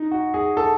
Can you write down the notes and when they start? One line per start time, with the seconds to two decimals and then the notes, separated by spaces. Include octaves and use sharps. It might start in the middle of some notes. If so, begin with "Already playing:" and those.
Already playing: D#4
0.11 F#4
0.34 G#4
0.57 A4